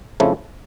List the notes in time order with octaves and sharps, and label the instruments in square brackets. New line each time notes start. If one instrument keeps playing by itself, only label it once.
[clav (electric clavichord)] F2 C#3 F3 A3 E4